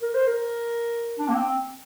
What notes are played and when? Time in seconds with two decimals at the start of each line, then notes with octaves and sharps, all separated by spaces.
0.02 A#4
0.15 C5
0.27 A#4
1.19 D4
1.29 A#3
1.34 C4